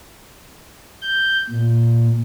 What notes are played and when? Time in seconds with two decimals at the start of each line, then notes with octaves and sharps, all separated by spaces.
1.02 G6
1.50 A#2